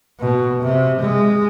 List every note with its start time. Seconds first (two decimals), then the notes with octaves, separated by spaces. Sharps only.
0.20 B2
0.63 C3
1.01 G#3